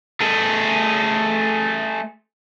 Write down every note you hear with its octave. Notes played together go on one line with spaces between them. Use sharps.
A3 G#4